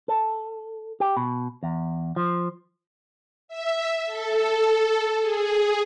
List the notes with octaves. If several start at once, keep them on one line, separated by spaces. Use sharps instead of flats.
A4
G4
B2
E2
F3
E5
A4
G#4